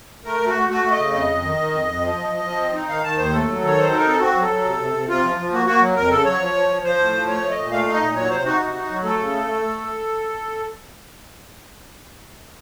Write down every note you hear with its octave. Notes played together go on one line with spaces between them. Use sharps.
A3 A#4
A3
F#4
A3
A3 F#4
A3
D#5
C#3
F2 D#5
F2
D#3
D#3
F2
F2
F3
F3
F3
F3
C4
D#4
D#3 F5
D#3 A5
D#2 C5
A3 A4
F#3
D#3 C#5
F#3 C5
D#4 A#4
C4 A4
C4 F#4
F#3
A4
F#3
C3
C3
C3
C3 F4
F3
F3
A#3 F#4
A#3 F#4
F#3
F2 A#4
C#3 A4
F#3 C#5
F3
F3
F3
F3 C5
A2
F3
A3 C#5
A3
D#5
A#2
A3 F5
D#4
D#5
A#2
F#3 C#5
C3 C5
D#4 F#4
C3
D#4
F#3
A3 A4
C#3
A3
A3
A3